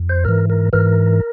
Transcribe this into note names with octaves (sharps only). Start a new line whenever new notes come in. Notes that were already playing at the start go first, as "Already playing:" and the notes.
Already playing: F2
C5
G#2 E3 A#4
A#4
G#2 E3 A#4